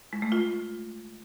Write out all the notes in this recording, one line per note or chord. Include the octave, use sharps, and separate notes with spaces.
G#3
A3
F4